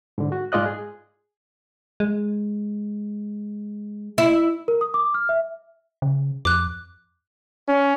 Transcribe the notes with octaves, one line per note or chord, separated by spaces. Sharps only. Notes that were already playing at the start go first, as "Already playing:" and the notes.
G#2 D3
F#4
G#2 G#3 F4 D5 D#5 F#6
G#4
G#3
E4
A#4
D#6
D6
F6
E5
C#3
F2 D6 F#6
C#4